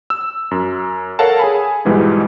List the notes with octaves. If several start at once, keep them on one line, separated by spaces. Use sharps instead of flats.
E6
F#2
A4 A#4 C#5 F5 F#5 A5
G#4 G#5 B5
B1 G#2 B2 E3 G3 G#3